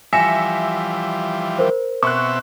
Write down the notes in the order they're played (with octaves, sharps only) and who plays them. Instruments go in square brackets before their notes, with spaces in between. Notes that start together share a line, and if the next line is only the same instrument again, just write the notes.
[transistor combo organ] E3 F3 G3 [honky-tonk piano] E5 C#7 [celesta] G#5 A#6 E7
[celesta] A#4 C5
[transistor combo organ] B2 C4 E5 [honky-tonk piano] C#6 F#6